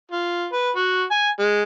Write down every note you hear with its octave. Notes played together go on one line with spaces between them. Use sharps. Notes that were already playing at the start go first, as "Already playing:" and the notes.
F4
B4
F#4
G#5
G#3